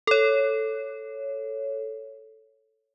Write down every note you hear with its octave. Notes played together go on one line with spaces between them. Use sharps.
A4 C#5